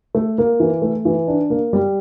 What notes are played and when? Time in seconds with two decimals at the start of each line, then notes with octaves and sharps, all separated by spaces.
0.15 A3
0.38 A#3
0.60 E3
0.82 A3
1.05 E3
1.28 D4
1.50 A#3
1.73 G3